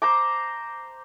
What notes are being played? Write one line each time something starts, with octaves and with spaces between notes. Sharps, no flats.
C5 A#5 D6